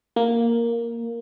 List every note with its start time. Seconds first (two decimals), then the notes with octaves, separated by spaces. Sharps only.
0.16 A#3